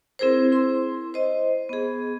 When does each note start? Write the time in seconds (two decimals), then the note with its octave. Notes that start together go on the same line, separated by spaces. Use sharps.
0.19 C4 E4 G#4 A#4 C5
0.52 E4 C6
1.14 C5 D#5
1.69 B3 G#4